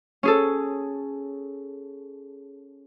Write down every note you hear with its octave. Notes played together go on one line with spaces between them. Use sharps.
C#4 G#4 A4